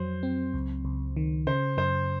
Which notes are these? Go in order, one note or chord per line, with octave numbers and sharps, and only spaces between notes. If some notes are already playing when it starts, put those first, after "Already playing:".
Already playing: F2 F#3 C5
C4
C#2
C#2
D#3
C#3 C5
F#2 C5